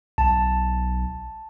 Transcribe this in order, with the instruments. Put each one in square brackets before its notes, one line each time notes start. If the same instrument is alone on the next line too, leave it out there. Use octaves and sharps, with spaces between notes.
[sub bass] B1 [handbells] A5